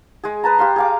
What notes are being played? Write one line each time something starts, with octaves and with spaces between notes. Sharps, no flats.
G#3 G#4
B4 A5 A#5
G4 F5 C6
G#4 F5 D6